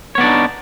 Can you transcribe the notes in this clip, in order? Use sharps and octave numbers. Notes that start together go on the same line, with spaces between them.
B3 D4 D#4 C#5 D5